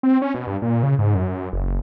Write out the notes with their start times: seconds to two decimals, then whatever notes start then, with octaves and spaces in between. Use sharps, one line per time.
0.03 C4
0.22 C#4
0.34 B2
0.47 G2
0.62 A#2
0.83 C#3
0.99 G#2
1.15 F#2
1.29 F#2
1.53 F#1